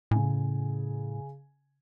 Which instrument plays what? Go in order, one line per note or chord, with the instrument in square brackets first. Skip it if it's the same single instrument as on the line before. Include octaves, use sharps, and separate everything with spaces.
[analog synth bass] A2 [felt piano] C#3 G#5